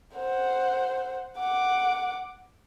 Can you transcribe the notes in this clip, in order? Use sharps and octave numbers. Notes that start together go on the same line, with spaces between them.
C5 F#5
F#5 D6